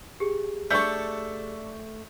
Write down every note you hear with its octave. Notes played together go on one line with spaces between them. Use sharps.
G4 G#4
A3 D4 A4 C#6 G6